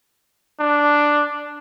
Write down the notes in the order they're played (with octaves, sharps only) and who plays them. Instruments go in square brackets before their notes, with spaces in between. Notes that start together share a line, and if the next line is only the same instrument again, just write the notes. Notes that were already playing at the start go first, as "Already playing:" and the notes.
[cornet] D4